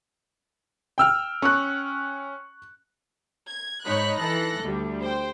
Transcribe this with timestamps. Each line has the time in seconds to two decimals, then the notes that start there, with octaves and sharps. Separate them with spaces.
0.98 G5 E6 F6
1.42 C#4 C#6 F#6
3.49 G#6
3.85 G#2 D#4 C#5 B5 F#6 B6
4.16 E3 A4 F#6 A#6
4.63 D2 G3
5.01 C5 G5